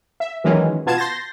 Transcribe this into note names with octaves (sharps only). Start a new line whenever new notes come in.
E5
D#3 E3 F#3 G#3 C#4
B2 B3 F4 A5 G#6 E7
C6 G6 A6 A#6